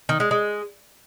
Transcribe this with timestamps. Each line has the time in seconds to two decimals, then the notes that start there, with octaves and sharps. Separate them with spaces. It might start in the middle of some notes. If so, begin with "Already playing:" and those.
0.09 D#3
0.20 G#3
0.31 G#3